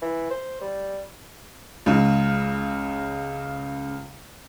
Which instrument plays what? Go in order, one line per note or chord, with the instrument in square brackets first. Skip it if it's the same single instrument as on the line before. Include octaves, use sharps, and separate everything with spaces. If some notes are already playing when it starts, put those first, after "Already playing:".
[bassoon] E3
C5
G3
[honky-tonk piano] C#2 C#3